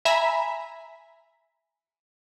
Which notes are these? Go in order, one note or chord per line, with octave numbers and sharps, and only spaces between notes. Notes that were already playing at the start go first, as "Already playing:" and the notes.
E5 G#5 A#5 B5 B6